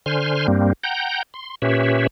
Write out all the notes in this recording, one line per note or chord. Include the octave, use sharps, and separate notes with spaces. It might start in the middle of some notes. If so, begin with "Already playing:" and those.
D3 C5 G#5 C6 F6
G2 G3 A#3 C4
F#5 G5 A#5 G6
C6
A#2 C#4 G4 B4 C#5 E5